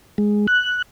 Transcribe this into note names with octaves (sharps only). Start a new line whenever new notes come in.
G#3
F#6